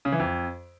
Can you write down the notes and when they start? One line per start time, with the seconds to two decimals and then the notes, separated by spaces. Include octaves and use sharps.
0.05 C#3
0.12 E3
0.20 F2